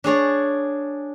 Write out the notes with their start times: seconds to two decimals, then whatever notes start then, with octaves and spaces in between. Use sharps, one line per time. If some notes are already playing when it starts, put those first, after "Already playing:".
0.04 D4 G#4 C#5 D5